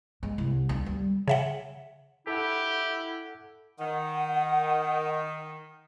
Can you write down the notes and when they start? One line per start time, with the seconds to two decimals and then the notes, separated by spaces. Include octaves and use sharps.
0.23 G#3
0.38 C2
0.69 D2
0.86 G3
1.28 C#3 E5 F#5
2.27 E4 G4 A4 F#5
3.79 D#3 F#5